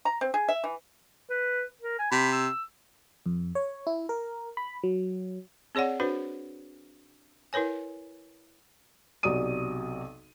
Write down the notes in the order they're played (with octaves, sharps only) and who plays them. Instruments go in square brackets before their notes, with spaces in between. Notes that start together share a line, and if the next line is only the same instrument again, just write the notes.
[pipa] A#5
C4
G#4
E5
E3
[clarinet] B4
A#4
G#5
[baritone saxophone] C3 [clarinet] B5
[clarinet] E6
[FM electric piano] F2
C#5
E4
A#4
B5
F#3
[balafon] C4 G#4 C#5 D5 F#5
D4 F#4 B4 C5
E4 A#4 B4 C#5 G#5
[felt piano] B1 C3 F#3 D5 D#6 D#7